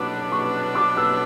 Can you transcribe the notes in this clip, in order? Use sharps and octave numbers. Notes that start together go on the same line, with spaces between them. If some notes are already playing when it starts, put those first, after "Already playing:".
Already playing: B2 F#3 B3 D4 D6
C#6
D6
E6